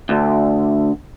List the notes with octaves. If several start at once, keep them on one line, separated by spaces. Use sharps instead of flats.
D2